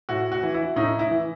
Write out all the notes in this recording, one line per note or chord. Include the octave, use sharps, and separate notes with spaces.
A2 F#4
F#4
E3
E4
A2 D#4
E4
E3